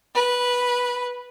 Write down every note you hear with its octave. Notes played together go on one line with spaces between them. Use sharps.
B4